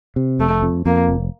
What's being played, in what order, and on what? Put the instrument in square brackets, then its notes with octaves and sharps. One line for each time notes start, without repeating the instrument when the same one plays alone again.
[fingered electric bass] C3
[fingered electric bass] F1 [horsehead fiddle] A3
[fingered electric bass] F2
[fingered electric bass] F2 [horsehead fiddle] A#3
[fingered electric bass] F1